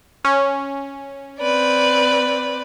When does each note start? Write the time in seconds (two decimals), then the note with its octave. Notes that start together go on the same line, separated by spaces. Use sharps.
0.25 C#4
1.39 C4 B4 D5